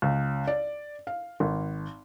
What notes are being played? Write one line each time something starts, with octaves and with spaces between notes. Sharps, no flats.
C#2
D5
F5
G#1